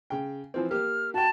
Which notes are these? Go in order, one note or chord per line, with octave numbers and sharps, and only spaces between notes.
C#3 G5
E3 F3 C4
A#3 G4 F6
F#4 G5 A5